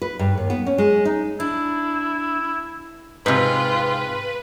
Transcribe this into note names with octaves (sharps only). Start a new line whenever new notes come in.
B4
G2
D#2
B3
C#4
G#3
D#4
D4 E4
G#2 C3 F4 B4